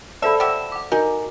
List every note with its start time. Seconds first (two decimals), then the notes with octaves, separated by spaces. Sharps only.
0.22 A4 C5 D5 E5 A5 B5
0.40 F#4 G4 E5
0.72 F#5 D6
0.92 D#4 F#4 A#4 G#5